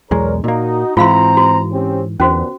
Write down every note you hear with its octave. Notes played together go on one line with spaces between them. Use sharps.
B1 E2 G#3 A#4 C#5 D5
A#2 A#3 D#4 F#4
G#2 E3 C4 F4 F5 A#5 C6
F#4
C4 C#4 G4
E2 A#2 D3 B3 C#4 F#4 C5